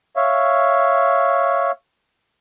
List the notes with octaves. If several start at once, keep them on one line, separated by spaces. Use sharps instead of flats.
C#5 E5 F5